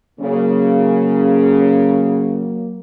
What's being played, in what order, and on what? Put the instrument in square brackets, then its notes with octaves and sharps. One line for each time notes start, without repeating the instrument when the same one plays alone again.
[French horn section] C#3 [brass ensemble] F#3 A#3